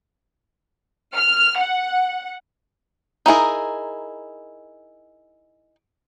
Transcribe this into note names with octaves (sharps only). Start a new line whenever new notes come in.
F6
F#5
D#4 E4 G#4 A#4